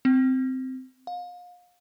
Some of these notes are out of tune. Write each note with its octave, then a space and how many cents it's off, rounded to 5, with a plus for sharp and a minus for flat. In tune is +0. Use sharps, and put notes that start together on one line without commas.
C4 -10
F5 +35